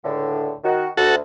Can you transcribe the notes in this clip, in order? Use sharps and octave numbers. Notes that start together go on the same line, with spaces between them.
C#2 A2 D3
D#3 F#4
D2 F#4 A4